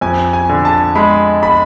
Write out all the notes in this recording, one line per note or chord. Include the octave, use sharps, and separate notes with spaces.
F2 G#5
G#5
D3
A5
G#3 B5
B5